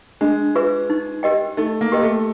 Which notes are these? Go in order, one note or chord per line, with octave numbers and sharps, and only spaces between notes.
G#3 D4
F4 G#4 B4 E5
D#4
G4 A#4 D#5 G5
A3 D#4
A#3
G4 A#4 D#5 G5
A3